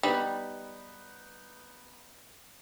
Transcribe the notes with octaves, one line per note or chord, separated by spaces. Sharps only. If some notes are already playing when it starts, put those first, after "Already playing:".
G3 B3 D#4